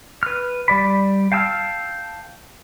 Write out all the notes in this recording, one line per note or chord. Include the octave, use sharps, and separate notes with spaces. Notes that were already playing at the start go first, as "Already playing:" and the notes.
B4 F6
G3 D5 B5
F5 G5 A5 E6 F6